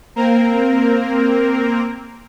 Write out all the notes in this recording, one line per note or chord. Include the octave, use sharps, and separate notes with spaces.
A#3 C4 A#4